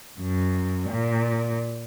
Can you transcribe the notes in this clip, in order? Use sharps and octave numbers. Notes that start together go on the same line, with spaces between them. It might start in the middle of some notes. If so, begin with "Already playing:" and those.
F#2
A#2